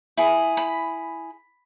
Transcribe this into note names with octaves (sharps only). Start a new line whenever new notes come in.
E4 G#4
B5